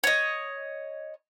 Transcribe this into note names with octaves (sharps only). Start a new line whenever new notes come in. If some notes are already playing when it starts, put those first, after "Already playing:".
C#5 D#5